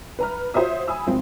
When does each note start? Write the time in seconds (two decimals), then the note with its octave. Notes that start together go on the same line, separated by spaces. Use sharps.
0.19 B4 A#5 F6
0.54 F4 F#4 C5 C#5 E5 D#6
0.88 G#5 B5 D#6 E6
1.07 G#1 F3 C4